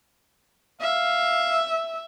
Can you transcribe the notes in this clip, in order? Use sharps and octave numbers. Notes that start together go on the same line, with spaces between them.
E5 F5